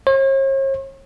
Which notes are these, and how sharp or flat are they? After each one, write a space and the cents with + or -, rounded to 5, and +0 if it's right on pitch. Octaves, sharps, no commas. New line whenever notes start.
C#5 -45